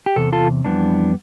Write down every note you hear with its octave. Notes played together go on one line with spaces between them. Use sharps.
G4
E2 C3 A4
F4 A4
F2 E3 G3 B3 D4